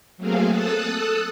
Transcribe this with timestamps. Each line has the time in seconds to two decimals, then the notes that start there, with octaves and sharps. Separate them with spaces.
0.17 F#3 A3 A#3 C4 G#4 F5
0.49 A4 A5 D#6 E6 F#6